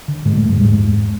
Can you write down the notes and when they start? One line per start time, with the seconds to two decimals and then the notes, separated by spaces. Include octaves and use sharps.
0.08 D3
0.25 G#2 D3 G#3
0.37 A2 A3
0.43 F2
0.49 G2 G3
0.61 E2 G#2 G#3
0.78 E2